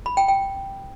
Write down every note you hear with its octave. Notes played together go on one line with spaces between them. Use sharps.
B5
G5
G5